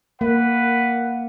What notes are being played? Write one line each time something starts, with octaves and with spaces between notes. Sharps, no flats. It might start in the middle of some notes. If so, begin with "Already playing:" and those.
A#3 B4 F#5